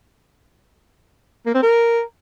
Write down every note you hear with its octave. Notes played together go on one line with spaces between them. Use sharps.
A#3
C4
A#4